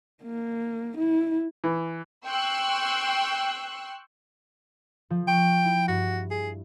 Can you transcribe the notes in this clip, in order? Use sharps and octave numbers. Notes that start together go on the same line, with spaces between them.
A#3
E4
E3
G5 C6 C#6 E6 F#6
F3
G5 C6 C#6
E4
G2 F#4
G#4